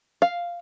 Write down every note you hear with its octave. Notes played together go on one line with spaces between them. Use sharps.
F5